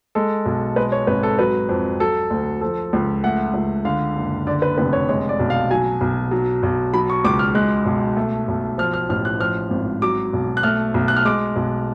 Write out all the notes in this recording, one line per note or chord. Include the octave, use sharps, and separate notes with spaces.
G#3 A4
B1
G#3 B4
C#5
G#1 B4
A4
F#3 B4
F2
F#3 A4
D2
F3 A4
C#2
A3 F#5
C#2
D3 F5
F#1
D3 D5
B4
F1 B4
C#5
G#3 C#5
D5
B1
F5
F#3 G#5
B1
F#3
B1
F#3 B5
C#6
C#2 D6
F6
G#3 F#6
B1
A3
B1
F3 F6
F6
A1 F6
F#6
F3 F6
G#1
F#3 D6
B1
F#6
A3 F6
B1
F#6
F6
G#3 D6
B1